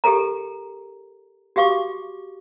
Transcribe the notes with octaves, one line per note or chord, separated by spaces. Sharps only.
G4 A4 A#4 A#5
F#4 G4 F5 C#6 D6